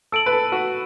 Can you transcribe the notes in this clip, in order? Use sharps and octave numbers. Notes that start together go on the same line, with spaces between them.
A4 E6 D7 F#7
B4
A4
F#4